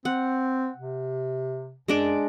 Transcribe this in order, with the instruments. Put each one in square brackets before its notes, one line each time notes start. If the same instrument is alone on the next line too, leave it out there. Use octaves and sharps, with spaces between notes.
[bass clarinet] C4 [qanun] F#5
[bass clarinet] C3
[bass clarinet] F#2 [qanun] G#3 D4 D5